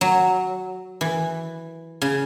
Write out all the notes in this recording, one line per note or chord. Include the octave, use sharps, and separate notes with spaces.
F#3
E3
C#3